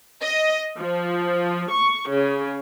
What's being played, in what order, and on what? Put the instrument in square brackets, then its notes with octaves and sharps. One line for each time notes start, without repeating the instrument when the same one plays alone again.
[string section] D#5
F3
C#6
C#3